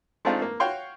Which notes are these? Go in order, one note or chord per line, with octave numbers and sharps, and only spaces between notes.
G#3 A3 C4 D4 D#4 F4
A#3
F#4 C#5 F5 G5 C6 C#6